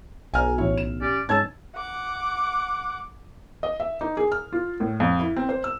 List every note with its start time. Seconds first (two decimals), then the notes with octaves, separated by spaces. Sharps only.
0.34 B1 G#5 A#5 F6
0.58 A1 E4 C#5
0.78 E7
1.01 C#4 G4 D5
1.29 G#2 C#4 D#4 A5 E6 G#6
1.76 F#5 D6
3.63 D#5
3.80 E5
4.01 D#4
4.17 G#4
4.32 F6
4.53 F4
4.80 A2
5.00 F2
5.19 E4
5.36 C4
5.49 C5
5.64 E6